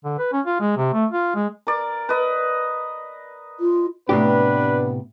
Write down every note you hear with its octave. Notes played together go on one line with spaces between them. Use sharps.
D3
B4
C#4
F4
G#3
C3
A3
F4
G#3
A#4 D5
B4 D#5
F4
A2 C3 B3 D4 G4 B4